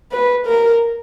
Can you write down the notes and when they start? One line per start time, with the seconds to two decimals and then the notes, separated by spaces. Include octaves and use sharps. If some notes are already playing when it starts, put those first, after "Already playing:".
0.12 B4
0.46 A#4